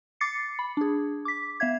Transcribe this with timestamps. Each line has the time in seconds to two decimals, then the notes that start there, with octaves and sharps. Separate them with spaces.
0.21 D6 A6 C7 C#7
0.59 B5
0.77 D4 G#4
1.25 D6 B6
1.60 B3 E5 F5 G#6